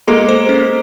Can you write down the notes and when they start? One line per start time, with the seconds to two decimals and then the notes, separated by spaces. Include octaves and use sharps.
0.07 G#3 A#3 A4
0.29 C5
0.49 C#4